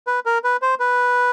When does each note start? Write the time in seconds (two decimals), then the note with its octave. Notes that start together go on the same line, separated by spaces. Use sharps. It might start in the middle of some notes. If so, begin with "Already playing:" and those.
0.07 B4
0.26 A#4
0.44 B4
0.62 C5
0.80 B4